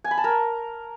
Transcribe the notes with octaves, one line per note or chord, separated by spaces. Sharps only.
G#5
B5
A5
A#4